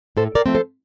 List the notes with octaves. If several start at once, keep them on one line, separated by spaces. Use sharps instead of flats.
A2 A4 C5
A#4 D5
F3 A3 C4
A4 C5